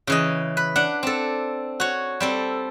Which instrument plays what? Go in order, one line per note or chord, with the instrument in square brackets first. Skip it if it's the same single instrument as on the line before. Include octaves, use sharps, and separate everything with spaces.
[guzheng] C#3 E3 D#5
B4
D4 F#5
C4 A4
F#4 C#5
G3 C4 A4